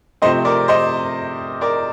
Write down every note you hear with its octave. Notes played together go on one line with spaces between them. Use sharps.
C3 F3 A3 C4 C5 D#5
A#4 D5
C5 D#5
A#4 D5